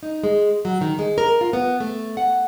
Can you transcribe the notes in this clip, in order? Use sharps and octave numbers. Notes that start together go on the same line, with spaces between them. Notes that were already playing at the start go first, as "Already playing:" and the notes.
D#4
G#3
F#3
D#3
G#3
A#4
F4
B3
A3
F#5